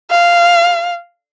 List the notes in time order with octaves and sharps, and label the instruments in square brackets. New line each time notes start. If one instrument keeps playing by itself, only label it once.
[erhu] F5